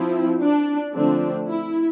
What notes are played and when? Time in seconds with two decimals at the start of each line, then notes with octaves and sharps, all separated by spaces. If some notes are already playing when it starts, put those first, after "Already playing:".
Already playing: F3 C4 E4
0.41 D4
0.94 D3 F3 A3 C4 D4
1.47 E4